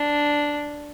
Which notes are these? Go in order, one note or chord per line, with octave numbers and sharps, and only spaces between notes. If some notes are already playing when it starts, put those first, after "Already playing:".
Already playing: D4